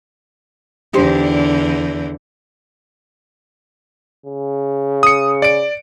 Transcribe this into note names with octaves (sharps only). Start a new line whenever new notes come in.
E2 D3 D#4 G4 C5
C#3
D#6 C#7
D5 D7